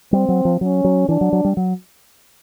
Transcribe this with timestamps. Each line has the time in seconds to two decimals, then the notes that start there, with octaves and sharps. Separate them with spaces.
0.13 G3 C4
0.29 F#3
0.45 F3
0.61 F#3 C#4
0.84 F#3
1.09 E3 D4
1.21 F#3
1.33 F#3
1.45 G3
1.57 F#3